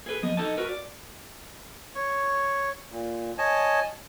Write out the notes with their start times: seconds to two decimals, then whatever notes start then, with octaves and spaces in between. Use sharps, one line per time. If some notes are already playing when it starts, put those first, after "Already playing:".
0.06 G#4 A4 B4
0.23 F3 B3 D#5
0.37 D#4 A4 D#5 A5
0.57 F#4 A#4 B4
0.69 D5
1.95 C#5 C#6
2.91 A#2
3.38 C#5 D#5 G#5 A5